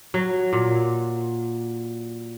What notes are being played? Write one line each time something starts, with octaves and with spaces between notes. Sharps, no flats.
F#3
A#2